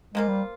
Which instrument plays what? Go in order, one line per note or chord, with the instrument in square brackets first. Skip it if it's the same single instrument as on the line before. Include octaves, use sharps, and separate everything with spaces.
[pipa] F3 A#3 F4 [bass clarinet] G#3
[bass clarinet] G3